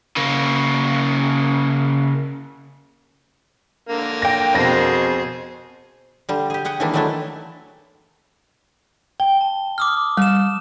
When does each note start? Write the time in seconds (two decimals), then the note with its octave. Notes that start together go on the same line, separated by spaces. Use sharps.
0.16 C#3 A#3
3.89 D3 A#3
4.22 G5 A#6
4.54 F2 B2 G#4 C5 A#6
6.29 D3 G3
6.50 G4 G#4
6.65 G4 G#4 F#5 G5
6.80 D#3 E3 G#3 A#3 D4 E4
6.94 D#3 F#3 G#3 A3 D4 E4
9.20 G5 G7
9.41 A5
9.78 D6 D#6 F6
10.17 G3 F6 E7